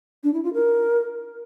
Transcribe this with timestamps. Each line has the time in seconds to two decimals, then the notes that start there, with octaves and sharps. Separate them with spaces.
0.24 D4
0.34 E4
0.44 F4
0.54 A#4